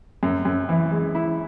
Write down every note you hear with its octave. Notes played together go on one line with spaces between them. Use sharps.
F#2
F#2
E3
G#3
E4